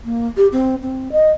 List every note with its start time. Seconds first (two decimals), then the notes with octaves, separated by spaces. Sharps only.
0.05 A#3
0.37 G4
0.52 C4
0.82 C4
1.12 D#5